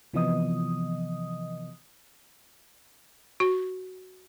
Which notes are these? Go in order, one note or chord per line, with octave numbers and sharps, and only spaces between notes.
C3 E3 F3 B3 D#5 D#6
F#4